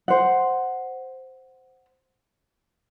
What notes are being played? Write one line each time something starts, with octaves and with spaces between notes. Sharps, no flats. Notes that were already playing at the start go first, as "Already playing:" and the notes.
C5 F#5